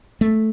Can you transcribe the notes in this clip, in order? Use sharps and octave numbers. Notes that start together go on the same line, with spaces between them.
A3